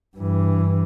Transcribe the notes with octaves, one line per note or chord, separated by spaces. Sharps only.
G2 E3